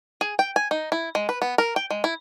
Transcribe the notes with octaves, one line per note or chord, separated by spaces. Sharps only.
G#4
G5
G#5
D#4
E4
G#3
B4
B3
A#4
G5
G#3
E4